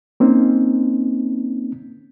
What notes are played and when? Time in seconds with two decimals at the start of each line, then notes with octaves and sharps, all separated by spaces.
0.20 A#3 C4 C#4 D#4